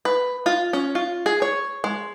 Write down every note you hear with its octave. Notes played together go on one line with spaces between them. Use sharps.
B4
F4
C#4
F4
G#4
C#5
G#3